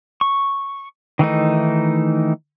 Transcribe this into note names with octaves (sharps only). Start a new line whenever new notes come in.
C#6
D#3 E3 A3 D#4